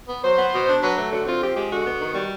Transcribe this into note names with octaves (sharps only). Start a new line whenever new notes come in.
B3
F#3 C5
B3
B2
D4
F#3 B4
A3
D3 F#4
C4 F4
F3 G4
G#3 G4
D3 F#4
B3
D#3
G3